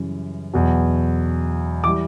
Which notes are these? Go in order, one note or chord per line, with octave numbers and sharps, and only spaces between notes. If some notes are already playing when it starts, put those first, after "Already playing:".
Already playing: F#2 C#3 E3 G3
E2 B2 F#3
E3 G3 D6